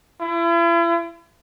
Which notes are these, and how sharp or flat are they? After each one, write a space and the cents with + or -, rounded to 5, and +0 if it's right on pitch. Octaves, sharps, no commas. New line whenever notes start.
E4 +40